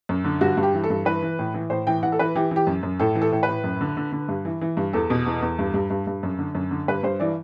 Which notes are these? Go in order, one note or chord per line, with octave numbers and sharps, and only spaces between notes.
F#2
D3
G2 F#4
G2
G4
E3
A4
G2
E3 B4
E3
A2
E3
A2 C5
E3 G5
E3 F#5
A4
E3 B4
E3 G4
E3 G4
F#2
F#2
A2 A4
E3
A4
A2
B4
A2
F#2
D3
D3
D3
G2
E3
E3
G2
E2 A4
B2
E2
E2
G2
G2
G2
G2
F#2
D3
F#2
D3
G2 B4
G2 C5
E3 D5